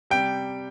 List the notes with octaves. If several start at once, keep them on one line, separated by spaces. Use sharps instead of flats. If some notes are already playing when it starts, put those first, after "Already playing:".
C3 G3 G5